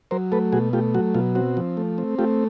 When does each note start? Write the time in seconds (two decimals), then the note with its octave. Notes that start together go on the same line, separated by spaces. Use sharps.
0.11 F#3 A#4 C5
0.32 A3 A4 B4
0.52 B2 F#4 G#4
0.73 A3 F4 G4
0.94 F#3 F#4
1.14 B2 F4
1.35 C4 F#4
1.57 F3
1.77 A3
1.98 C4
2.19 A3 F4 G4